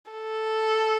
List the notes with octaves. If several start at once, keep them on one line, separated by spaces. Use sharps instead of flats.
A4